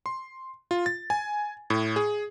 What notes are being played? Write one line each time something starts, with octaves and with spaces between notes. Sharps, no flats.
C6
F4
A6
G#5
A2
G#4